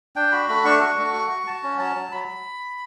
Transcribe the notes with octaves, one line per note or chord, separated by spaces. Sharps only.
D4 G5
F#4 B5
A3 B5
D4 C#6
F#4 C#6
A3
F#4
F#4
F#4 A5
C#4
F#3 A5
F#3
F#3 B5